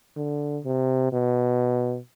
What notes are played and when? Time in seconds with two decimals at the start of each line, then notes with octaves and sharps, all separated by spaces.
0.17 D3
0.65 C3
1.12 B2